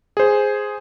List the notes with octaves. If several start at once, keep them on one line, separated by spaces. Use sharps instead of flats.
G#4 C5